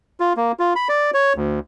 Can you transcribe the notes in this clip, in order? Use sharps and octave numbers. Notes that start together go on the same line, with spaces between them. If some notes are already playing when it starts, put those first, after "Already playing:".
F4
A#3
F4
B5
D5
C#5
D2